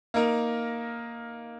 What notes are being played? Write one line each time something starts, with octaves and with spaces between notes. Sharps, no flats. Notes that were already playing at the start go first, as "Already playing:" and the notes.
A#3 D#4 A#4